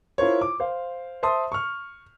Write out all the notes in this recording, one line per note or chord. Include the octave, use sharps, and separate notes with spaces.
E4 F4 A#4 C5 C#5
D6
C5 F5
C5 E5 A5 C6 D#6
C#6 F6